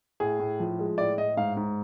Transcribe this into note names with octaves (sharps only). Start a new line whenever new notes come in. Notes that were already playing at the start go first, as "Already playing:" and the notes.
A2 G#4
A2
F3
G#3
A2 D5
A2 D#5
G#2 F5
G#2